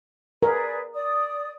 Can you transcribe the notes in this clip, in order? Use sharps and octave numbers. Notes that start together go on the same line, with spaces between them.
G#4 A#4 B4 D5
D5 D#6